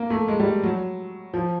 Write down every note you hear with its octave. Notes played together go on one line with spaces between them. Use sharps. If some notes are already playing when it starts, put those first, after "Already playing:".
Already playing: A#3
A3
G#3
G3
F#3
F3